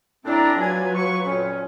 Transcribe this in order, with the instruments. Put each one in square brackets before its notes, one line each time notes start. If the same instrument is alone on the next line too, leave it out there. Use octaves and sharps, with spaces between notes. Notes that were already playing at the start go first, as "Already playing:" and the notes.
[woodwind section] A2 C4 D4 [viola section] E4 D5 A#5
[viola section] F#3 F4 B4 [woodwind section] G#5
[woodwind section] C#6
F2 A#2 C#4